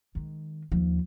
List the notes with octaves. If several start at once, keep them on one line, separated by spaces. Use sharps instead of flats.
D#3 G#3
D#2 F3